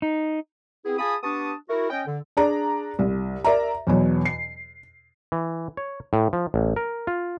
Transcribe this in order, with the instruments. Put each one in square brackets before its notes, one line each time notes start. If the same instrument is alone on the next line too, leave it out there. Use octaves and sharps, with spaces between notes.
[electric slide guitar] D#4
[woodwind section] B3 C4 E4 G#4
F4 G#4 G#5 A5 B5 D#6
B3 D4 G4 A5 C#6 D#6
E4 F#4 A#4
C#4 D#5 G5
D3
[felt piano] D4 G#4 D5 A#5
C2
A#4 D5 E5 A#5
E2 B2 F#3
C7
[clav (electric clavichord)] E3
C#5
A2
F3
A1
A#4
F4